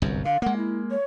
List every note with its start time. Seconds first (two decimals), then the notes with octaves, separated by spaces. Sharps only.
0.02 G1 C2 F#2
0.25 D3 F5
0.42 G#3 A#3 F#5
0.57 E4
0.91 C#5